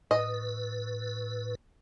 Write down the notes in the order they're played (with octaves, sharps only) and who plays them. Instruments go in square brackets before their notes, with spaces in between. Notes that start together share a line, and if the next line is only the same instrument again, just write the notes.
[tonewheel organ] A2 B4 [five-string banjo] D#5